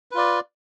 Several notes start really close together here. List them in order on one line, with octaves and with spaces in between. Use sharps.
B4 F4 D5